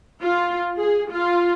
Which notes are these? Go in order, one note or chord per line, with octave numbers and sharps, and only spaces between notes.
F4
G#4
F4